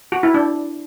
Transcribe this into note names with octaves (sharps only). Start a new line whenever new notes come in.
F#4
E4
D4